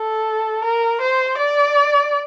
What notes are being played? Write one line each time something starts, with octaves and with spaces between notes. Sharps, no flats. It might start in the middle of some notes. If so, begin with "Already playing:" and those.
Already playing: A4
A#4
C5
D5